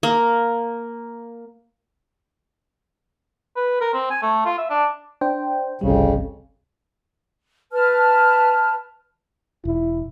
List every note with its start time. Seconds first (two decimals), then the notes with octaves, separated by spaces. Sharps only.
0.03 A#3
3.56 B4
3.81 A#4
3.94 C4
4.11 G#5
4.22 A3
4.45 F4
4.58 E5
4.70 D4
5.21 D4 C5 G5
5.81 G1 C2 F2 C#3 G3
7.72 B4 A5 F6
9.65 E1 E4